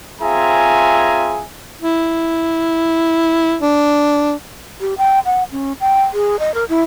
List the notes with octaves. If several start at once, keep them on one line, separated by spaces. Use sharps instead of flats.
C4 F4 G#4 E5 G#5 A#5
E4
D4
G4
G5
F#5
C#4
G5
G#4
D#5
A#4
E4